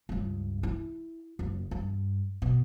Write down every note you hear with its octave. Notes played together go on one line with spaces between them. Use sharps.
C#2 G2
E4
F#1
G2
B2